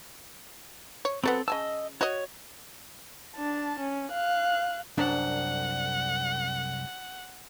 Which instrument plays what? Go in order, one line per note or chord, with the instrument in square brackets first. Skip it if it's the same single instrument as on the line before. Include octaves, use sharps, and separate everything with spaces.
[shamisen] C#5
[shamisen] F#3 A3 B3 [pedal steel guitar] C4 A4
[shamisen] C#3 G#5 A5 [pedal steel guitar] D#5 E6
[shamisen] F#4 D#5 [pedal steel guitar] C#5
[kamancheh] D4 A5
C#4
F5 F#6
[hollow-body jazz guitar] C2 F#2 D4 [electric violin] F#5